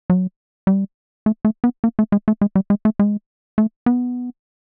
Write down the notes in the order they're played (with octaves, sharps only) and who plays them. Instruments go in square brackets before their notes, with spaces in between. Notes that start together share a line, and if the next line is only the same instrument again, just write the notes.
[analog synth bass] F#3
G3
A3
A3
B3
A#3
A3
G#3
A3
G#3
G3
G#3
A3
G#3
A3
B3